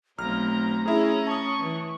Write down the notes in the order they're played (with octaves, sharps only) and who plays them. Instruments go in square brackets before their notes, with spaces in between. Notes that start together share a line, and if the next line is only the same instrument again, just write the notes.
[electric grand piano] B1 F6 [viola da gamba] A3 C4 [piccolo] A#5
[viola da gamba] C#4 [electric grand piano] E4 G#4 [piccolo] A#5
[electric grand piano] A5 D#6 [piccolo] C#6
[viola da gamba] E3